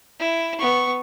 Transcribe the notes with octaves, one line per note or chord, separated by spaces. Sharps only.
E4
B3 C#6